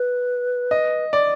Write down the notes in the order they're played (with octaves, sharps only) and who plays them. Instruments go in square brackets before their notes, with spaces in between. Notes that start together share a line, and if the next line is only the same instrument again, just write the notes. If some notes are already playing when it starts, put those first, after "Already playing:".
Already playing: [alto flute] B4
[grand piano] D#5
D5